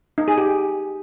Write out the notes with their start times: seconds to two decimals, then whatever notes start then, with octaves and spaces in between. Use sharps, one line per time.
0.18 D#4
0.28 G#4
0.38 G4